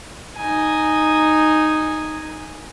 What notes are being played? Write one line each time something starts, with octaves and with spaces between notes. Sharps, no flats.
D#4 G#5